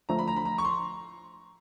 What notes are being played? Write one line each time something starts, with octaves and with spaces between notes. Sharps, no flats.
D3 F3 A3 A#5
B5
A#5
B5
A#5
C#6
C6